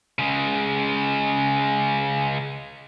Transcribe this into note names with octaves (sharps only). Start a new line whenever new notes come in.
C#3 G#3